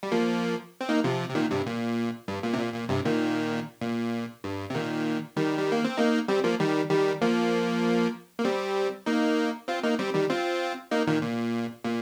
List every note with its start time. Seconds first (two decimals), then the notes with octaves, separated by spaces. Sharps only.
0.03 G3
0.12 F3 A#3
0.81 C4
0.89 A#3 D#4
1.04 C3 F3
1.29 C3
1.35 A#2 D#3
1.51 G2 C3
1.66 A#2
2.28 G2
2.43 A#2
2.53 C3
2.59 A#2
2.74 A#2
2.89 G2 C3
3.05 A#2 D#3
3.81 A#2
4.44 G2
4.70 C3
4.75 A#2 D#3
5.37 D#3 G3
5.58 G3
5.72 A#3
5.85 C4
5.97 A#3 D#4
6.28 G3 C4
6.44 F3 A#3
6.60 D#3 G3
6.90 D#3 G3
7.21 F3 A#3
8.39 A#3
8.45 G3 C4
9.06 A#3 D#4
9.68 C4 F4
9.83 A#3 D#4
9.99 G3 C4
10.15 D#3 G3
10.30 C4 F4
10.91 A#3 D#4
11.07 A#2 D#3
11.22 A#2
11.84 A#2